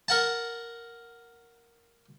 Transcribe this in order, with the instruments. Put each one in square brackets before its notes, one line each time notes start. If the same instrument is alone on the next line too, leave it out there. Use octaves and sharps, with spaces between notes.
[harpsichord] A#4 F#5 A5